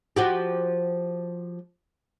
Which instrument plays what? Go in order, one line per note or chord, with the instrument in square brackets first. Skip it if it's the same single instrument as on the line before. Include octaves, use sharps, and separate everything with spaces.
[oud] F3 F#4 G4